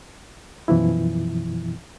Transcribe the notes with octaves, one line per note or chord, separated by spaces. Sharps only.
F#2 B2 E3 F3 E4